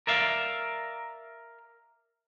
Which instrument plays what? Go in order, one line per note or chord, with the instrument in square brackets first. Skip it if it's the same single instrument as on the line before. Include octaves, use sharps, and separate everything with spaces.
[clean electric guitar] A#4 D5 E5 F5